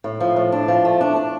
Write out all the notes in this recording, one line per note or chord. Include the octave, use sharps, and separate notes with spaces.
A2
F3
A2
D4
F3
A3
D4
D4